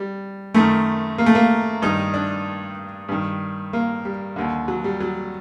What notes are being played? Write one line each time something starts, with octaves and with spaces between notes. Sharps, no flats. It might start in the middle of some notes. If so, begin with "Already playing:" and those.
Already playing: G3
F#2 D#3 A3
A#3
A3
A#3
G2 D#3 D#4
D4
G2 D#3
A#3
G3
D#2 D3
F#3
G3
F#3